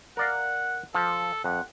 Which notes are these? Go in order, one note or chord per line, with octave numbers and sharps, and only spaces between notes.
A#4 D5 F5 F#5
F3 A4
F2 F#5